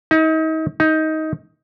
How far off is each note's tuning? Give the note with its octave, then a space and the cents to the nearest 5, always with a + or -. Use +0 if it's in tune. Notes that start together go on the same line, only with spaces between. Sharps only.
D#4 +35
D#4 +15